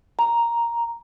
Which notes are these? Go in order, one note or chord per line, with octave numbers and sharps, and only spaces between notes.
A#5